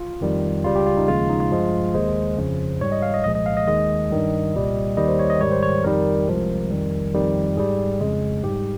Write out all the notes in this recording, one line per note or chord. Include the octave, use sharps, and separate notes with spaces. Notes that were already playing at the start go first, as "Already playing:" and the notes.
Already playing: F4
F2 D#3 G3
C#2 C#3 G3 F4
G4
F4
D#4
D#2 C#3 F3 G#3 F4
D#4
F4
G2 F3 G#3
D#2 D#3 G#3 C5
F2 C#3 F3
G#2 G3 C#5
D#5
F5
D#5
C2 A#2 F3 G#3 D#5
D#5
F5
D#5
D#2 D#3 G#3 D#5
G2 D#3 G3
C2 A#2 G3
D#2 D#3 G3 D#5
C5
C#5
D#5
G#2 D#3 G3 C#5
C5
C#5
F2 D#3 G3 A#4
C2 C3 F3 G#3
F2 D#3 G3
F2 D#3 G3
G#2 G3 G#4
F2 C#3 G#3
G#2 G3 G4